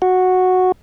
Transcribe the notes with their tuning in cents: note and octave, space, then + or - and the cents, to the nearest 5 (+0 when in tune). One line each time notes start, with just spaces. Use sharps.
F#4 -5